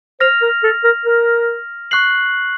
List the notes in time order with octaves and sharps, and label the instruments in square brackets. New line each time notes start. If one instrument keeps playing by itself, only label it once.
[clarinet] C5 [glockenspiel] F6 A#6 F7
[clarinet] A#4
A4
A#4
A#4
[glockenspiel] C#6 F#6 C7 F#7